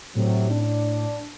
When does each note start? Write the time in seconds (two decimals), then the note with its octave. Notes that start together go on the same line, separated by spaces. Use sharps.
0.16 A2 C3 F#3 C4
0.50 D4